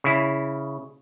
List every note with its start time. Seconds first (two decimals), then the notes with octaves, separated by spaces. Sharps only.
0.04 C#3 E4